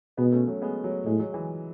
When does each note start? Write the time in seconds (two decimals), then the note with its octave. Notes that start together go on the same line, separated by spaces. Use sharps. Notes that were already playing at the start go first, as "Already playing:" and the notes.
0.17 B2 G#3 B3
0.32 A3 C#4
0.47 F#3 A3
0.62 G#3 B3
0.84 F#3 A3
1.06 A2 G#3
1.19 F#3
1.33 E3 G#3